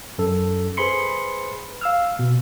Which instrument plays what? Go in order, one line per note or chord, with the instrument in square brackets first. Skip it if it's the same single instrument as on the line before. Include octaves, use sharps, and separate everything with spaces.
[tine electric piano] F#2 A4
G#4 B4 C5 B5 C6 C#7
F5 E6 F6
B2